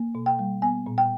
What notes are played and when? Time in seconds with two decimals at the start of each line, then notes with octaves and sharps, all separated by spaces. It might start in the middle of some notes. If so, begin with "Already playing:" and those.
Already playing: A#3
0.15 B2
0.26 G5
0.39 G3
0.62 B3 G#5
0.86 A#2
0.98 G5